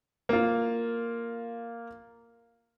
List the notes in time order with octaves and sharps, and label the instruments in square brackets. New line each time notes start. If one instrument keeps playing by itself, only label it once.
[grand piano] A#3 F4